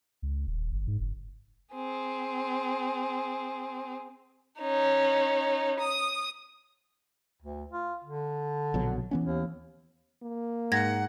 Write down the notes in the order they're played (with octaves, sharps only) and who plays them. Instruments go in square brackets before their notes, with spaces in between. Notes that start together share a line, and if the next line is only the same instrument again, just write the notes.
[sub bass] C#2
D#1
G1
G#2
F#1
[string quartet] C4 G#4
[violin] C#4 D#4
D#6
[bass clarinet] D2
F4
D3
[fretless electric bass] A#1 B2 F#3
E3 B3 C#4
[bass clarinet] D#2
[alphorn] A#3
[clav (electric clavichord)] G#2 [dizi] F#5 [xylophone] G#6 A#6